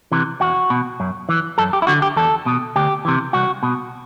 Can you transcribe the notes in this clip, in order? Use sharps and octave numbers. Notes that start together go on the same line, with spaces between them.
C3 E3
E2 F#4
B2
F#2
E3
F#2 A4
G4
E4
D3 F#4
G4
E2 A4
B2
D2 G4
C3 E3
C2 F#4
B2